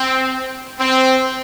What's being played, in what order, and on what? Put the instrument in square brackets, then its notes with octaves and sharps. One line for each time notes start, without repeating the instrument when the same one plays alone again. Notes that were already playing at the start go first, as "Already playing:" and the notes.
Already playing: [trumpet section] C4
C4